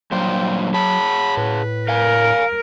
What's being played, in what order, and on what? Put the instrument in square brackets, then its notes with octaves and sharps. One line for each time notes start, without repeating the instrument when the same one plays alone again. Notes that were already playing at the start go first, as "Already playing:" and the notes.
[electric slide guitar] G2 A#2 C5 [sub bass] F#3 [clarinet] G5
[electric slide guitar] G#4 C#5 A5 [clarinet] B5
[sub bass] A2 [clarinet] B4
[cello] A#4 [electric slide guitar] F5 G#5